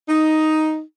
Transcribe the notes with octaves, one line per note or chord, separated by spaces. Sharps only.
D#4